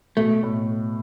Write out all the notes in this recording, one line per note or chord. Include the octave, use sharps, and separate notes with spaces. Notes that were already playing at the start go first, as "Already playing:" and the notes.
B2 A3
A2